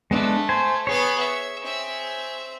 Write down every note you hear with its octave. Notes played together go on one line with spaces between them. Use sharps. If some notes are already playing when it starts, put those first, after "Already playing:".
G#3 A3 B3 D4
C5 G#5
B3 G#4 C#5 B5
E5
C4 E5